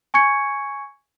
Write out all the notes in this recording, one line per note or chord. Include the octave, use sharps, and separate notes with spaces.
G#5 C#6 G#6 C#7